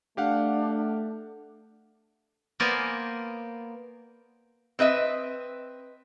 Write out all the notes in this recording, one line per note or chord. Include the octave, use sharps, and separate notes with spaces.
A3 D4 G4 F5 F#5
A#3 B3 A#4 C5 D5 G#5
C4 B4 D#5 E5